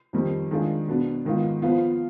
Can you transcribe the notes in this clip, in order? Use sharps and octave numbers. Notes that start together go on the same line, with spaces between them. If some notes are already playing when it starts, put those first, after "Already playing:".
F2 D#3 G3
D#3 G#3 D4 F4 G#4
B2 B3 D4
G#2 D#3 B3 F4
F3 B3 F4